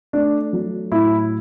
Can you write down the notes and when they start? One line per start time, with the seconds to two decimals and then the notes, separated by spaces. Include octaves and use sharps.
0.13 A3 D4
0.53 F#3
0.91 A2 E4